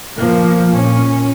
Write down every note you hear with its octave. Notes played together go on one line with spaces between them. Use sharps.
F3 A#3
A#2 C#4